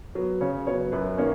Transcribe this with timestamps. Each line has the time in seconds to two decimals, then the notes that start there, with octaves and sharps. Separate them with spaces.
0.15 F#3 B3
0.41 C#3 C#5
0.67 F#3 B3 C#5
0.92 F#2 B4
1.18 D#3 A#3 C#4 C#5